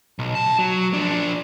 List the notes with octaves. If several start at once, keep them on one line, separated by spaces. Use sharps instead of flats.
B1
F2 A5
F#3
F3 D4